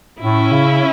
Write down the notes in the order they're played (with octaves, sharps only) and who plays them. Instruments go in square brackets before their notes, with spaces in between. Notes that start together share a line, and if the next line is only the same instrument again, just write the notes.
[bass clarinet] A2 [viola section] C#4 E4
[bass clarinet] C#3